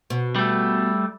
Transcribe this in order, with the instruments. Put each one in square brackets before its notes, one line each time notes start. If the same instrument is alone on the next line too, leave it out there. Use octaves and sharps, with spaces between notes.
[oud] B2
[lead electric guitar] G3 A3